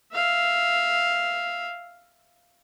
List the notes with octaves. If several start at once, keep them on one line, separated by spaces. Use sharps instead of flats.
E5 F5